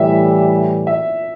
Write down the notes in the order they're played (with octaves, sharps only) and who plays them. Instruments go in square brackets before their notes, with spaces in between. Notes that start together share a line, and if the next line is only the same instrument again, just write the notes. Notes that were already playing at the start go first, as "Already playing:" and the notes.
Already playing: [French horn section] A2 E3 G3 [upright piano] E5
[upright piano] E5